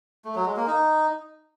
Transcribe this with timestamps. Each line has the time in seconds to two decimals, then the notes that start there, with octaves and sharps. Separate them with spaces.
0.25 A3
0.35 F#3
0.46 G#3
0.56 A#3
0.67 D#4